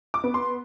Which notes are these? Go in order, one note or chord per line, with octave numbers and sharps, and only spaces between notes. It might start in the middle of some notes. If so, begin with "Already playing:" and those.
D6
B3
C6